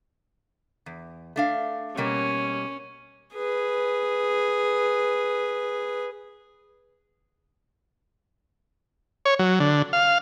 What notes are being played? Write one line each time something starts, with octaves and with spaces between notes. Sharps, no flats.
E2
A3 D4 F5
B2 G3 A#3 C#4
G#4 B4
C#5
F#3
D3
F5